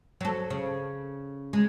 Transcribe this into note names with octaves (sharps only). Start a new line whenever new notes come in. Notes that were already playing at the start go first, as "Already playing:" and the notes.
F#3 A4
C#3
G#3